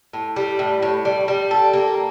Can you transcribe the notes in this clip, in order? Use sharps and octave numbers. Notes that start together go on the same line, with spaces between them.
A2
G3
A2
A2
G3
G3
A4
A#3